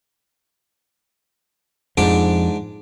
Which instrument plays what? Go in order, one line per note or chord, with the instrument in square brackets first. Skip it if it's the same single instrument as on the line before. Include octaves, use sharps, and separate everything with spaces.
[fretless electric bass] F2 F3 [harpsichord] G#2 D4 D6